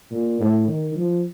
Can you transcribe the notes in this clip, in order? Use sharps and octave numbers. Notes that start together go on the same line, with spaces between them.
A#2
A2
D#3
F3